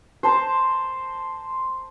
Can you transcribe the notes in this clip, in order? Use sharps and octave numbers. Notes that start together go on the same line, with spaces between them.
C5 A5 A#5